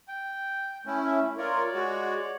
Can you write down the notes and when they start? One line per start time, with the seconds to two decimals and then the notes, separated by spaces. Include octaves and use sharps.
0.08 G5
0.86 A3 C#4 E4
1.06 E5
1.37 F4 A#4 C#5 D5
1.73 G#3 F#4